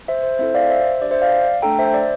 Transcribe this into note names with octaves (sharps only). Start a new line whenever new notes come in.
C5 E5
C5
C4 E4 A4 C5 E5
D5 F5
C5 E5
D4 G4 D5
C5 E5
D5 F5
A3 D4 A4 G5 A#5
C5 E5
D5